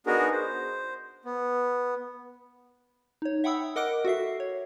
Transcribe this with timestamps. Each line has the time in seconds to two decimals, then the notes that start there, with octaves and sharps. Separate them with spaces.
0.06 B3 D4 D#4 F#4 G#4 A#4
0.31 C5
1.25 B3
3.22 D#4 C#5
3.44 E5 F#5 G5 B5 D#6 E6
3.76 A#4 D#5 F#5 D6 F#6 D7
4.05 F#4 A4 E5 C7
4.40 C#5